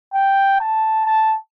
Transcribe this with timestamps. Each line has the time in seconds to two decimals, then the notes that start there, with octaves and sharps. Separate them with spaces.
0.14 G5
0.61 A5
1.06 A5